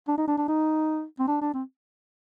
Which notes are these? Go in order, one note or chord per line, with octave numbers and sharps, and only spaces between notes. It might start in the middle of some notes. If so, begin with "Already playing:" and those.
D4
D#4
D4
D4
D#4
C4
D4
D4
C4